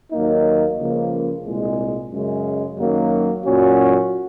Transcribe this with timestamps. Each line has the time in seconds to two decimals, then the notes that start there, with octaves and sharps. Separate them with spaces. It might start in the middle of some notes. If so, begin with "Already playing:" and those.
0.12 D#2 D#3 F#3 A#3 D#4
0.78 C#2 C#3 F3 A#3
1.45 C2 A#2 G#3
2.12 F#2 C#3 G#3 C#4
2.78 F#2 D#3 F#3 A#3
3.45 A#2 F#3 C#4 F#4